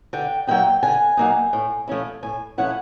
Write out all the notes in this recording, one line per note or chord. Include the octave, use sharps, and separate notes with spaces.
D3 G5
F#3 A#3 D#4 G5
D3 G#5
F#3 A#3 D#4
A2
F3 A3 C#4 E4
A2 G#5
F3 A3 C#4 E4 F#5